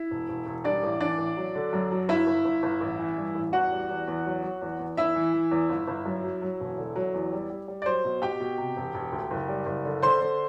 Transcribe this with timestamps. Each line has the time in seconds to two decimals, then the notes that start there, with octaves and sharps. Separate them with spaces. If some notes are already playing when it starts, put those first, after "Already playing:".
Already playing: E4
0.11 E1
0.29 E1
0.46 E1
0.64 G3 D4 D5
0.83 A1
1.00 E3 D4 D5
1.18 A1
1.37 F#3
1.55 D3
1.73 F#2
1.92 F#3
2.09 G1 E4 E5
2.27 G1
2.45 G1
2.63 G1
2.81 A1
2.99 E3
3.18 G2
3.35 A1
3.53 E2 F#4 F#5
3.72 G3
3.90 E2
4.08 E2
4.26 F#3
4.43 F#3
4.61 E2
4.79 E2
4.97 E2 E4 E5
5.16 E3
5.33 E3
5.51 E2
5.69 G1
5.88 G1
6.05 F#2
6.24 F#3
6.42 F#3
6.60 E1
6.78 D3
6.96 F#3
7.14 E2
7.33 G3
7.50 G3
7.68 G3
7.82 D5
7.86 F#3 C5
8.05 B2
8.22 B2 G4 G5
8.40 B2
8.58 C3
8.77 E1
8.94 E1
9.12 D2
9.31 F#1
9.49 G3
9.66 F#1
9.85 D3
10.02 D3 C5 C6
10.21 D3